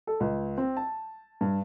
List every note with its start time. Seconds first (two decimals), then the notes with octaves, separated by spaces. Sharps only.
0.07 A4
0.20 C#2
0.58 C4
0.77 A5
1.41 G2